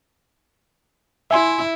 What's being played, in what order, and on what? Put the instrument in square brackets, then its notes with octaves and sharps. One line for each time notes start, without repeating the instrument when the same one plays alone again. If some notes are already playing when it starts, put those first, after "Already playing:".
[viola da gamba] E4 [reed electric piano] E5 G#5 C6